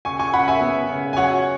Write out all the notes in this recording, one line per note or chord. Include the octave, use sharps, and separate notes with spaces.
C#3 G#5 C#6
G#5 C#6
C#3 F#5 B5
E5 G#5
B3
C#3
G#5
F#3 C#5 F#5